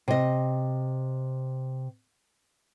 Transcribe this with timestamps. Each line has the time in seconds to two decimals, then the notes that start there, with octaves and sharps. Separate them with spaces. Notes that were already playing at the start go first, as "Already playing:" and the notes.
0.08 C3 D#5